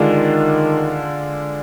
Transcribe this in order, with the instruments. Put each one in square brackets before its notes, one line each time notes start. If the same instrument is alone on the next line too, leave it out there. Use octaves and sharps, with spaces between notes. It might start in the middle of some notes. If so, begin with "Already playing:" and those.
Already playing: [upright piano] D3 G#3 D4 F4 [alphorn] D#3